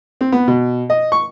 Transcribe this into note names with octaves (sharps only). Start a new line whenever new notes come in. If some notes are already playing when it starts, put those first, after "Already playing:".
C4
B3
B2
D#5
C#6